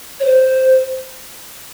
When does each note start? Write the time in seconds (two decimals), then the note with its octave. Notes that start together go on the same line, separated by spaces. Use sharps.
0.20 C#5
0.25 C5